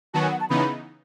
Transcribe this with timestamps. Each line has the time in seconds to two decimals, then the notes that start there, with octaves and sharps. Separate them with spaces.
0.14 D#3 F#3 B3 F#4 A5
0.23 G#5
0.31 F#5
0.40 A5
0.50 C#3 E3 B3 D#4 B5